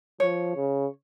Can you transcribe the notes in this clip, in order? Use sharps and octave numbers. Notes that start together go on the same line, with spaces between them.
F3 C#5
C#3